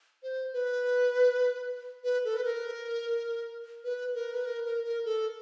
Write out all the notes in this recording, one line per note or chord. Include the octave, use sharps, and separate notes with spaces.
C5
B4
B4
A4
B4
A#4
B4
A#4
B4
A#4
A#4
A#4
A4